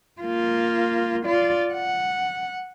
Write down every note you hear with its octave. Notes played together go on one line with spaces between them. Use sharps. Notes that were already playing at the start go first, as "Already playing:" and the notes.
A#3 F4
F4 D5
F#5